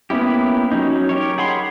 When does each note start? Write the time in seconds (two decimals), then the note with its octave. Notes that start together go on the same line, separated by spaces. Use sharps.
0.10 A#3 B3 C#4 E4 G4
0.71 F#3 C#4 D#4
1.09 G4 A#4 C#5
1.38 G#4 F#5 B5 C6